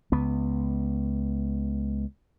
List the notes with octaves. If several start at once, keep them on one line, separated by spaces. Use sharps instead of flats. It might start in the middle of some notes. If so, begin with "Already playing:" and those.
C#2 B3